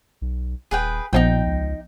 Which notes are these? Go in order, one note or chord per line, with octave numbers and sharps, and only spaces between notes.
B1
D#1 G#4 B4 G5
A#1 A#2 F3 B3 D#4 F4 G5
C#2